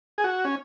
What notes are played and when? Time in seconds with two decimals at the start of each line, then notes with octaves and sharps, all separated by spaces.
0.18 G#4
0.24 F#4
0.45 C#4